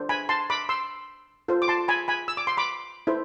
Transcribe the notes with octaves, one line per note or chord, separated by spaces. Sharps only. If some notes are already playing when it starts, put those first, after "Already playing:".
Already playing: D4 A4 C5
G#5 B5
A5 C6
B5 D6
C6 E6
F4 A4 C5
D6
A5 C6
G#5 B5
G#5 B5
E6
D6
C6
B5 D6
E4 A4 C5